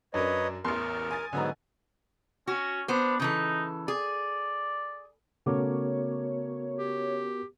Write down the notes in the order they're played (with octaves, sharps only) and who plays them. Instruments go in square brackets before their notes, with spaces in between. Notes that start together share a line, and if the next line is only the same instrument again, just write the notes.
[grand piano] F#2 [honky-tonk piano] D4 A#4 [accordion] B4 C#5 D#5
[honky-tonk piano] A1 E2 [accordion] A#4 [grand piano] C6
[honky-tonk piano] G#5 D#6 A6
[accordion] G#2 F#3 B3 [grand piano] D3 D#5 A#5
[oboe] C#4 [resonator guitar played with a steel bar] F#4
[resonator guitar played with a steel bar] B3 C5 [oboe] D4
[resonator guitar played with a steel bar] C#3 E3 A4 [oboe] D#4
[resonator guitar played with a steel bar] G#4 [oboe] D5
[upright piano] C#3 A3 D6 [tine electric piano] B3 F#4 A#4 [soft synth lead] C#5
[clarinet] G4